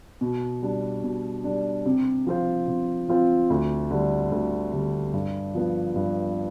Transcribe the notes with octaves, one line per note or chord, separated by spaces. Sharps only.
B2
G3 D4
B2
G3 D4
C3
F3 C4 F4 C5
C3
F3 C4 F4 C5
D2
D3 G3
D2
D3 G3
G2
F3 B3
G2